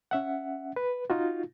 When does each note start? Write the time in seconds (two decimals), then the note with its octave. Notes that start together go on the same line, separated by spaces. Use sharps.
0.11 C#4 E5 F#5
0.76 B4
1.10 D#4 F4 F#4